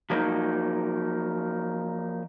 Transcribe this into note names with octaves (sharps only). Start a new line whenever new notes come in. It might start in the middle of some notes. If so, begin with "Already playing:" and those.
F3 F#3 A#3 D#4